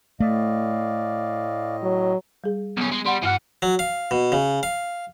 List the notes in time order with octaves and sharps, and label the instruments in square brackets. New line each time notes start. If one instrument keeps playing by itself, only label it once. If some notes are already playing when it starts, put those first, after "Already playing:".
[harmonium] A2 D#5 [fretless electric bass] A3 [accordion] D5 F5
[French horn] F#3
[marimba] G3 G#4
[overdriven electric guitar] B1 C#4 [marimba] B3
[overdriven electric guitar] G#3
[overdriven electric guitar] G3 [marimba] F#5 C6
[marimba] G2 F6 F#6 [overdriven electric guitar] E3 F#5
[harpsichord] F#3
F5
B2
C#3
F5